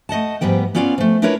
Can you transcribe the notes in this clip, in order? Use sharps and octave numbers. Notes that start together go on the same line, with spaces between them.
A3 D#5 F#5 A5
G#2 F3 G3 B3 G5
B3 C#4 F4 D5 F5
F3 A3
D4 E4 F4 A#4 B4 C#5